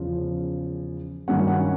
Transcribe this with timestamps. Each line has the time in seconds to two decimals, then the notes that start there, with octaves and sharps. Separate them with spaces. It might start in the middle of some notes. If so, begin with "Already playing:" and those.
Already playing: E2 C#3 F3
1.28 G2 D#3 F#3 A#3 C#4 F#5
1.48 F#5